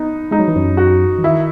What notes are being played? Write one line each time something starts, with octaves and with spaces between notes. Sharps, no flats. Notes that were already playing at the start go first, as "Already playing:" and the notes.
Already playing: B3 D#4
G#3 D#4
F#3
E3
F#2 F#3
F#4
E3
D#3 E4